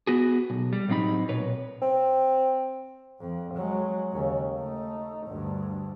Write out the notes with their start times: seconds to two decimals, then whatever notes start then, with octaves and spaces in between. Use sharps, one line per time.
0.07 B3 F#4 G#4
0.50 B1
0.73 G3
0.88 A2 F#3 C4 D#4 B5
1.29 B1 A#2 B4 C#5
1.82 C4
3.20 F2
3.54 F#3 G#3
4.12 D#2 C#3
4.55 A3 D#4
5.26 D2 G2